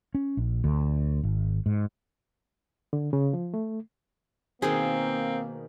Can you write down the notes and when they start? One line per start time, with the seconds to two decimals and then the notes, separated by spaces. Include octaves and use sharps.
0.15 C#4
0.37 A#1
0.64 D2
1.23 G#1
1.66 G#2
2.93 D3
3.13 C#3
3.33 F3
3.54 A3
4.62 B2 D#3 A#3 C4 G#4 C5